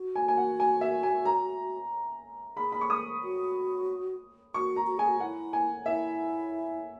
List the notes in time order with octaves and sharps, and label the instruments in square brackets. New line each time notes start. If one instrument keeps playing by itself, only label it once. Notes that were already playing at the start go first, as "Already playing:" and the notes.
Already playing: [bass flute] F#4
[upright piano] G#5
G#5
F#5
G#5
E5
G#5
A#5
[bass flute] G#4 [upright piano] B5
[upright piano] B5
C#6
D#6
[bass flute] F#4
[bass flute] F#4 [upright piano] C#6
[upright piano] A#5
[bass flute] F#4
[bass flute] G#4 [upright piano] G#5
[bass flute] F#4
[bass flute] E4 [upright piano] F#5
[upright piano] G#5
[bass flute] E4 [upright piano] E5